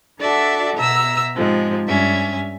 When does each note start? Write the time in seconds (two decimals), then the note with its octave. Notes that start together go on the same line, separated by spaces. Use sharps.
0.19 D4 F#4 A4 D5 E5
0.76 B2 E5 A#5 E6
1.35 G#2 C3 F3 G#3
1.88 G2 C#4 E5